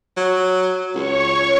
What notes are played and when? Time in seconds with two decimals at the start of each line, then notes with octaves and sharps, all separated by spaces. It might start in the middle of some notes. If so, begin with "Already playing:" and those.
0.17 F#3
0.95 C#2 C#5 C#6